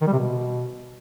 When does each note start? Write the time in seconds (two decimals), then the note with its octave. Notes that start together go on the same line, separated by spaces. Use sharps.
0.01 D#3
0.07 G3
0.13 C3
0.18 B2